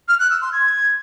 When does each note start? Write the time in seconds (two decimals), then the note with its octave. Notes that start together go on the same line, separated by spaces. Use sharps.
0.08 F6
0.19 F#6
0.30 E6
0.41 C6
0.52 G#6